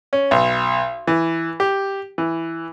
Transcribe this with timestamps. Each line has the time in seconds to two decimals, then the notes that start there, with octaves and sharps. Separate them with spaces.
0.13 C#4
0.31 B1
1.07 E3
1.60 G4
2.18 E3